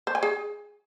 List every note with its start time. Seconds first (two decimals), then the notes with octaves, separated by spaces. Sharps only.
0.07 C5
0.15 G#5
0.23 G#4